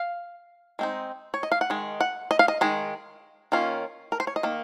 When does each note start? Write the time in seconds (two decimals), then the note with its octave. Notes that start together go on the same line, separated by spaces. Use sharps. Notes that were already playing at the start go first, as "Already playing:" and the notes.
Already playing: F5
0.79 G#3 C4 D#4
1.34 C#5
1.43 D#5
1.52 F5
1.61 F#5
1.70 D#3 G#3
2.01 F#5
2.31 D#5
2.39 F5
2.48 D#5
2.61 D#3 G#3
3.52 D#3 A#3 C#4 F4
4.12 A#4
4.20 C5
4.27 C#5
4.36 D#5
4.43 D#3 A#3